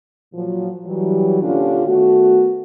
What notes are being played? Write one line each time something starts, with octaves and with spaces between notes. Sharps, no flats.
A#2 F3 F#3
E3 F#3 G3
A#2 D3 C#4 D4 F4 G4
D#3 A3 B3 F#4